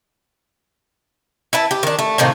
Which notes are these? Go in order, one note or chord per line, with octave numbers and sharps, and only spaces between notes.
E4 B4 A5
G4
D#3 D4
A3
A2 C3 D#3 A#3